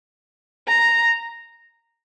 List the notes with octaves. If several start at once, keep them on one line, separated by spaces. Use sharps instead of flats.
A#5